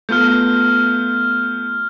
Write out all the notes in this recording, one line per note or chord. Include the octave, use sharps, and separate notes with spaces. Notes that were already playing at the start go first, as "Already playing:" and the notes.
A3 B3 F4 F6 G6